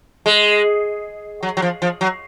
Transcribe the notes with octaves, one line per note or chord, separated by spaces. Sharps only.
G#3
F#3
F#3
F3
F3
F#3